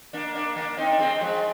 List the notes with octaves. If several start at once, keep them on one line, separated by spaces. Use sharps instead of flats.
A#3 D4
A#3 D4
A#3 D4
C4 D#4
D4
G#3 C4
F3 G#3